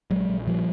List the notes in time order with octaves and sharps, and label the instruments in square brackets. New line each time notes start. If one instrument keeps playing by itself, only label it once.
[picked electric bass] A#1 F#3 G#3
A#1
A#2 F3 G3